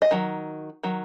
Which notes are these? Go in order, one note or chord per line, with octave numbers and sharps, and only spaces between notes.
D#5
D#3 F#3
D#3 F#3